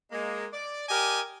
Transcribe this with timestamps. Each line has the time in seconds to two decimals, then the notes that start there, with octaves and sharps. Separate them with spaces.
0.11 G#3 A#3
0.53 D5
0.89 G4 A#4 D5 D#5 G#5